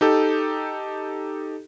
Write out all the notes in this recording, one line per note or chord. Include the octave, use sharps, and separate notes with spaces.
D#4 G4 A4